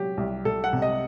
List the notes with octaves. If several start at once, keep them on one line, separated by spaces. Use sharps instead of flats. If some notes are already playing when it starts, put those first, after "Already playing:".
Already playing: C3 F#3 G4
C2
C2 A4
F#5
C3
D#5